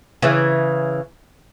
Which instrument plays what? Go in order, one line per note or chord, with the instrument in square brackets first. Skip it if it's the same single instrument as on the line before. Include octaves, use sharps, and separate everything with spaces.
[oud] C#3 E3